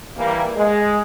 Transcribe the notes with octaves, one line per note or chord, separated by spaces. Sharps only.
E3 G3 A#3
G#3